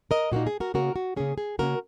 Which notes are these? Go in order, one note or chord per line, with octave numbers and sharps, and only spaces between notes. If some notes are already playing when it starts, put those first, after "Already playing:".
A#4 D#5
A#2 A#3 D#4 F#4
G#4
F#4 A#4
C#3 A#3 C#4 F#4 A#4
F#4
C#3 A#3 C#4 G#4
G#4
C#3 A#3 C#4 F#4 A#4